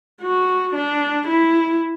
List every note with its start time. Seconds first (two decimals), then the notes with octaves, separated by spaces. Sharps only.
0.22 F#4
0.75 D4
1.28 E4